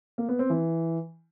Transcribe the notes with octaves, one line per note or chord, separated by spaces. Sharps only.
A#3
B3
C4
E3